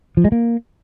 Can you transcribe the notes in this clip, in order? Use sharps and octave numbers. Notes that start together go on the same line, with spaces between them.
F3
G#3
A#3